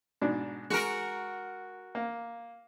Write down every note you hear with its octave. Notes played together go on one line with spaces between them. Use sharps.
G#2 B2 D4
G#3 F#4 A#4
A#3